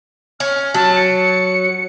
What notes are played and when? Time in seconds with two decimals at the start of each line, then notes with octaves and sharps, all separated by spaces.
0.40 C#4 F6
0.74 F#3 A5
0.96 C#7